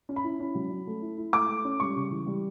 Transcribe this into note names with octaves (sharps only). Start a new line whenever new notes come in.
C#4
B5
E4
C#4
F#3
C#4
A3
E4
E4
A3 D6
A3
C#4
G3 C#6
C#3
E3
G3